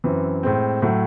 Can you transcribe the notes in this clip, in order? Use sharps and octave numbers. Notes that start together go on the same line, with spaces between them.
F#2 E3 C4
A2 G#3 C4
A2 F#3 A3